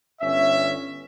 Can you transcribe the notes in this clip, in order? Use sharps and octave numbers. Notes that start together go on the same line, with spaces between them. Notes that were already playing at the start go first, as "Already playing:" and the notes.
G1 C#4 E5